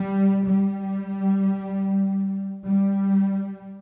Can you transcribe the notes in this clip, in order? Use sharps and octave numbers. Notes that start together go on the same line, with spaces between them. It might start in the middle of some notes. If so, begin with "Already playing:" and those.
Already playing: G3
G3
G3